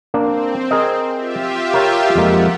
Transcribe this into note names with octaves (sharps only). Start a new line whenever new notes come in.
A#3 C4 D4
G#4 A#4 D#5
F4 G4 E5
A#4 C#5 G5
F2 G#3 A#3 F#5